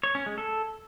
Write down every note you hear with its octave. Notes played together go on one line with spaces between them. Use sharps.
C#5
C#4
G#3
A4